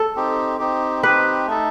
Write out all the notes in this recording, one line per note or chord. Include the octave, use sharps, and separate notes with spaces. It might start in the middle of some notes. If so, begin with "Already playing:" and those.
Already playing: A4
C4 D#4 G4
C4 D#4 G4
C4 D#4 G4 B4
A3 D#4 A4